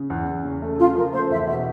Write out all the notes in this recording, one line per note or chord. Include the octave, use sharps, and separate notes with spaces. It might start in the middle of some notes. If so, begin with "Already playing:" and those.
Already playing: C#3
E2
E2
C#3
A3
C#3 F4
F3 A#4
A3 C5
E2 E5
B2 E5